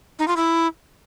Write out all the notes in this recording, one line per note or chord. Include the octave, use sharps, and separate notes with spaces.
D#4
F4
E4